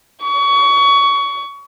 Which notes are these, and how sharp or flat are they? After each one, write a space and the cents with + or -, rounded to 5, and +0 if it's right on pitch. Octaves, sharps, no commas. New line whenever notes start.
C#6 +25